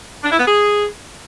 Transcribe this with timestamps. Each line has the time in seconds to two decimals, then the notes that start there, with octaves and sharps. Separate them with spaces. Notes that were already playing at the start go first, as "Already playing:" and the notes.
0.23 D4
0.31 E4
0.39 B3
0.47 G#4